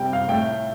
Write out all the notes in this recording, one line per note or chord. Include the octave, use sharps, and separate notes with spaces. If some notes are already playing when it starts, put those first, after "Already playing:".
Already playing: C3 G3 G5
F5
A2 A3 G5